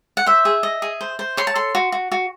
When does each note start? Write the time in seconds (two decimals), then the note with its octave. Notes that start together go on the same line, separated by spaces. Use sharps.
0.17 F#5
0.26 C5 E5
0.45 G#4
0.63 D#5
0.82 G#4
1.01 C5
1.19 C5
1.37 C#5 C6
1.47 A5
1.56 A4 C6
1.75 F#4
1.92 F#4
2.12 F#4